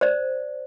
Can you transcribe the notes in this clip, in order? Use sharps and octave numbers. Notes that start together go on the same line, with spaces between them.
C5 D5